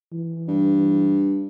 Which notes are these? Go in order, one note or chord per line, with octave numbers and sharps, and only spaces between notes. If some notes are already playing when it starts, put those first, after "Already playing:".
E3
G2